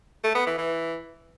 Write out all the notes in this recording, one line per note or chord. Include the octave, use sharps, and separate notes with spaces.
A3
B3
E3
E3